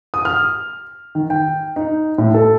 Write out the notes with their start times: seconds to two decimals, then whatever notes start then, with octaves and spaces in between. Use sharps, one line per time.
0.14 D#6
0.25 F6
1.15 D#3
1.30 G5
1.76 D#4
2.18 A2
2.34 A4